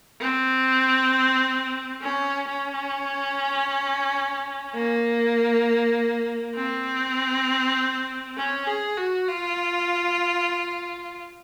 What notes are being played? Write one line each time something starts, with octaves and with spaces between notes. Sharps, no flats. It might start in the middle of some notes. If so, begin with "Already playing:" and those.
C4
C#4
C#4
A#3
C4
C#4
G#4
F#4
F4